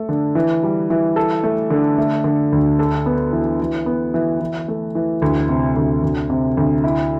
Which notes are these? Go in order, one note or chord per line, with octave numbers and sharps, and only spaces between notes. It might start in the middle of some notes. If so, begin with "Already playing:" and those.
Already playing: A3 A4
D3
E3
G3
E3
A4
A3
D3
A3
D3
D2
A4
B3
E3
E3
B3
E3
E3
A3
E3
D2
C3
D2
D2
C3
D2
E4